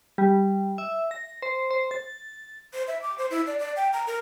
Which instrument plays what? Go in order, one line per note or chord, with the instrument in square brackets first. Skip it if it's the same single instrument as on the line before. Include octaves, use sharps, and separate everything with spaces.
[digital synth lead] G3
E5
A#6
C5
C5
A6
[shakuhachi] C5
E5
D6
C5
E4
D5
D5
G5
A#5
A#4